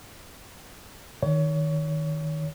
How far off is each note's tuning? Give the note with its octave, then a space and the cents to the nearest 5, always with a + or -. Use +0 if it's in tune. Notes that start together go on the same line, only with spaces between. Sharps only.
D#3 +0 C#5 +25